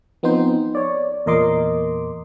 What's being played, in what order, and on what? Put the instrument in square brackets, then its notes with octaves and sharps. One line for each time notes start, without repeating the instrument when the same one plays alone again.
[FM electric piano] F3 B3 C4 D#4 C5
C#5 D5
E2 A#2 A#4 D#5 C6 D6